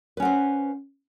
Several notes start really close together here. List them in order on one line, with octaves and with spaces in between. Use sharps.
B4 C#4 F#5 C5